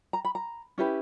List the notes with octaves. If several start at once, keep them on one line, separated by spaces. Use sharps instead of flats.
A#5
B5
A#5
C#4 E4 G4 B4